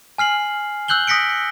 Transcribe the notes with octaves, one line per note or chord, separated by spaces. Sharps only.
G#5 F6 C7 F#7
E6 F#6 G6 F#7 G7
D#6 A#6 B6 C#7 D7